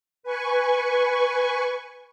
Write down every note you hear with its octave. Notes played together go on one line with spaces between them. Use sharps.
B4 G#5 C#6